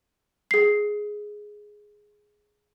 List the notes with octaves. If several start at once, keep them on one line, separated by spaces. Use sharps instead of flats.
G#4 C7